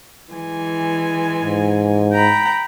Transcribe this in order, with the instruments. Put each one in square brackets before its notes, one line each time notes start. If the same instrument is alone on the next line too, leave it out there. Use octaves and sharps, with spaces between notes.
[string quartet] E3 G#3 G#5
[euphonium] G#2
[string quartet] G5 A#5 B5